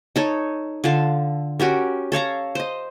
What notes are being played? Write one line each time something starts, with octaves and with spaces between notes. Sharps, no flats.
D#4 A4 C#5
D3 F4 A4 F5
C#4 F#4 G4 A#4
A4 C#5 F5 A#5
C5 D#5